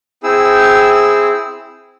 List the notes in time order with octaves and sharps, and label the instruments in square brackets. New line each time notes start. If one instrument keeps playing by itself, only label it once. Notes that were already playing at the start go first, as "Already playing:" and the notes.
[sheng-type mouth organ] C4 E4 G#4 E6